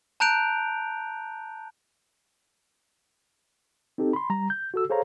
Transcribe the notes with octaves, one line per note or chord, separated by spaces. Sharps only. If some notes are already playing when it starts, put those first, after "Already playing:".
A5 A#5 F#6 G6 D7 F7
C4 D#4 G4 A4
B5 C6
G3 A#5
G6
F#4 A4 E6
G#4 A4 C5 C#5 F5 A#5